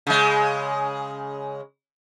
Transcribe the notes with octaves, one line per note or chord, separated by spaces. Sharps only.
C#3 G#3